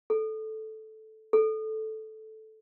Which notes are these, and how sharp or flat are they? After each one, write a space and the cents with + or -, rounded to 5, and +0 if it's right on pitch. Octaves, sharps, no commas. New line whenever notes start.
A4 -10
A4 -10